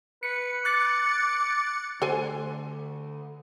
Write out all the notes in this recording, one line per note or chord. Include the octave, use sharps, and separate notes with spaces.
B4 C#7
D6 F#6 A6 C#7
D3 A3 A4 C5 G#5